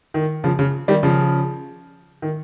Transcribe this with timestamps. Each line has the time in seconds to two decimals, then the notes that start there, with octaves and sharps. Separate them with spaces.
0.14 D#3
0.44 C#3 F3
0.59 C#3
0.88 D#3 G3
1.03 C#3 F3
2.22 D#3